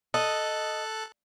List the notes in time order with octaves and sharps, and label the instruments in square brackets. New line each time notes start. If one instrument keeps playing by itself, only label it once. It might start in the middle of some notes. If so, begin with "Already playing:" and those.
[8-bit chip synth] A4 A5 F#6 [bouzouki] D#5